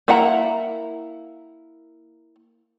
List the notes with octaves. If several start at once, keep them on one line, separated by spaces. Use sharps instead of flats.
A#3 E4 F#5 A#5